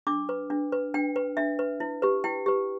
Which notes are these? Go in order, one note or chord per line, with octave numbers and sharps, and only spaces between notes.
D4 D6
B4
D4
B4
D4 G5
B4
D4 E5
B4
E4
G4 B4
E4 G5
G4 B4